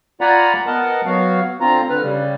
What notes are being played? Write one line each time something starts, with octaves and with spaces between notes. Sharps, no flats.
F4 D5 F#5 G#5 A#5 B5
B3 A#4 D#5 F#5 A5
F#3 B3 F#4 F5
D3 C4 F4 A#5
D3 B4 F6
C#3 G3